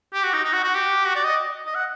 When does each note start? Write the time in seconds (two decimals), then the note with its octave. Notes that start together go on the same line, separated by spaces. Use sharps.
0.13 G4
0.23 F#4
0.33 D#4
0.44 D#4
0.53 F#4
0.64 F#4
0.74 G4
1.05 F#4
1.15 D5
1.24 D#5
1.66 D#5
1.75 F#5